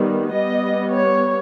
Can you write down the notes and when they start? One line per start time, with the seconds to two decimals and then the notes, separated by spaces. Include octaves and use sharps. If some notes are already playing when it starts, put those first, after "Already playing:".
Already playing: D#3 G3 B3
0.34 G3 B3 D#5
0.93 C#5